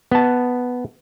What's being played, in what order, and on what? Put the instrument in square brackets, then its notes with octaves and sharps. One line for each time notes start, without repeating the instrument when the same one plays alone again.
[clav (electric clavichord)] B3 A5